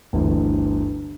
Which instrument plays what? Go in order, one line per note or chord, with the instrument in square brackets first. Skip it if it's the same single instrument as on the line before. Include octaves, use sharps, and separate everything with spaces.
[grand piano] G1 D2 E3